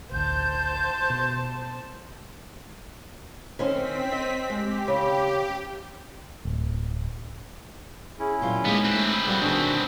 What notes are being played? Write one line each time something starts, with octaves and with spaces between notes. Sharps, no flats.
A1 D2 C5 A5 G6
B2
D#3 C4 C#4 C5 B6
D#5
G#3 G4
C#3
D1
C#4 E4 G#4
A#2 F#3 F4 G4
G#3 A#3 B3 D#4 G4
A3 C4 B4
G3 A#3 F#4 G4
B2 D#3 D4 F#4 G#4